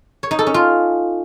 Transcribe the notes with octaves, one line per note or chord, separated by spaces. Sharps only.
C#5
D#4
A4
C#4
F4